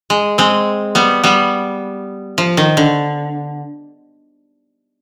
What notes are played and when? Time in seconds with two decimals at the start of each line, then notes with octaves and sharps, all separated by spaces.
0.10 G#3
0.38 G#3 C4
0.95 G3 B3
1.24 G3 B3
2.38 F3
2.57 D#3
2.77 D3